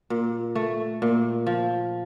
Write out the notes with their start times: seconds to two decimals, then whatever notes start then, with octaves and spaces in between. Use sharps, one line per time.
0.10 A#2
0.55 A3
1.02 A#2
1.47 F3